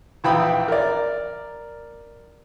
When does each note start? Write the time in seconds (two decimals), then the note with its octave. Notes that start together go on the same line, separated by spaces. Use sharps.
0.24 A#1 E3 G5 B5 D#6
0.68 A#4 D5